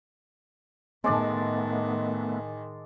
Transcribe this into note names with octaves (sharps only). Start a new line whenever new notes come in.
A2 D#3 G#3 A3 B3 D5 A5